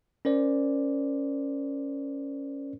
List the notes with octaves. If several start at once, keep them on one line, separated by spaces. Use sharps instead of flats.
C#4 A#4 C5 D5